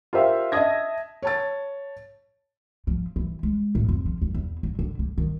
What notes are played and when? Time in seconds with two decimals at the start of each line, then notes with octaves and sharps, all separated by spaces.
0.13 F4 G4 A#4 C5 E5 F5
0.52 D#5 E5 A5 D#6 G#6 A#6
1.22 C#5 A5 A6
2.87 F3
3.16 E3
3.43 G#3
3.75 A2
3.89 F2
4.05 F3
4.22 D#2
4.34 E2
4.63 F#3
4.79 D3
4.99 D3
5.18 D#3